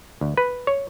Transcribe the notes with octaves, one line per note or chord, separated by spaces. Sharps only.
D2
B4
C#5